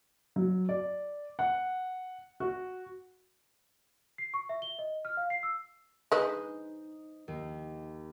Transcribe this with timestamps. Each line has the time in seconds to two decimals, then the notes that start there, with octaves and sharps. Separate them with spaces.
0.36 F#3
0.69 D5
1.39 F#5
2.40 F#4
4.18 C7
4.34 C#6
4.49 E5
4.62 G7
4.79 D#5
5.05 F6
5.17 F5
5.30 C7
5.43 E6
6.12 G#3 D#4 B4 C5 D#5
7.28 D#2